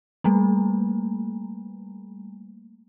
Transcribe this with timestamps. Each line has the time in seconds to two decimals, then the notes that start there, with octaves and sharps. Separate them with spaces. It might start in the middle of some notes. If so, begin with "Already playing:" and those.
0.24 G3 A3 A#3